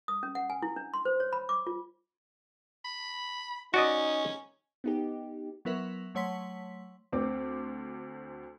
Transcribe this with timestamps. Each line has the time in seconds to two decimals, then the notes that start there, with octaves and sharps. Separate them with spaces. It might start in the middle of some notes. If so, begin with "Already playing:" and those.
0.08 D#6
0.23 C#4
0.35 F#5
0.50 G#5
0.62 E4
0.76 D4
0.94 C6
1.05 C5
1.20 C#5
1.33 B5
1.49 D6
1.67 F4
2.85 B5
3.74 C#4 D#4 F#4 D5 D#5
4.84 B3 D#4 G4
5.65 F#3 B3 E4 A#4 B4 E5
6.15 F#3 A3 C#5 F#5 C6 B6
7.12 D2 C4 D6